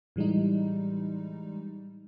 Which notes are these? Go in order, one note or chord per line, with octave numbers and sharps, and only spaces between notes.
A2 E3 G3 G#3 D#4